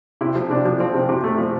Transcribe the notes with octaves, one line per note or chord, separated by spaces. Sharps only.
C3 E4
F3
C3 D4
F3
F3 C4
C3
C3
A3
F3